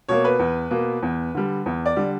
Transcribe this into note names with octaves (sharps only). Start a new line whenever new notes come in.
B2 A#3 C#5
B4
E2
B2 A#3
E2
D3 G3
E2
D5
D3 G3